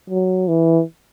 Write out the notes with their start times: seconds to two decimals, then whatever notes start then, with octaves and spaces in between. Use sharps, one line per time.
0.10 F#3
0.48 E3